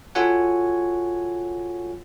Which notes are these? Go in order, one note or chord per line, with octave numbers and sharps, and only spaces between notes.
F4 F#4 A4 C#5 F#5 G#5